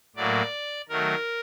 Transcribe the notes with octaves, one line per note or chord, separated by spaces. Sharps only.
A2 F#3 A#3 D5
D#3 F#3 A3 A#4